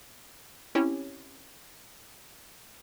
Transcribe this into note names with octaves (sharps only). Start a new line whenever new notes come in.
C4 C#4 E4 G4 C#5